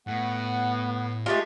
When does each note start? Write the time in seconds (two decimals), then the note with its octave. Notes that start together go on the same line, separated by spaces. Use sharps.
0.07 A2 B3 F#5
1.26 G#3 A3 F4 G4 D#5 E5